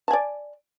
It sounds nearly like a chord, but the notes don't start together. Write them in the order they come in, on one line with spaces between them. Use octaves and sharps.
A5 G#5 D5